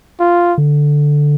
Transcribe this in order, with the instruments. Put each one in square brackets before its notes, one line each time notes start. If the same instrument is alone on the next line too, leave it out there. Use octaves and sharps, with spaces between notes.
[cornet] F4
[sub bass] D3